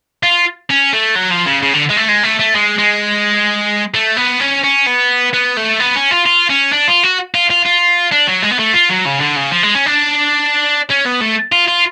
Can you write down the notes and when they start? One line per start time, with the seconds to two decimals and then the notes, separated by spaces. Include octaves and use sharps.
0.23 F4
0.70 C#4
0.93 A3
1.16 F#3
1.31 F3
1.46 C#3
1.62 C#3
1.73 D3
1.90 G#3
1.97 A3
2.09 G#3
2.23 A3
2.40 A3
2.55 G#3
2.78 G#3
3.94 A3
4.17 B3
4.41 C#4
4.64 C#4
4.87 B3
5.33 B3
5.57 A3
5.80 B3
5.96 C#4
6.11 F4
6.26 F4
6.49 C#4
6.73 D4
6.88 F4
7.03 F#4
7.35 F4
7.50 F4
7.65 F4
8.12 D4
8.27 F#3
8.42 G#3
8.51 B3
8.59 A3
8.73 F4
8.89 F#3
9.05 C#3
9.20 D3
9.36 C#3
9.51 F3
9.63 G#3
9.75 C#4
9.86 D4
10.91 C#4
11.06 B3
11.21 A3
11.52 F4
11.68 F4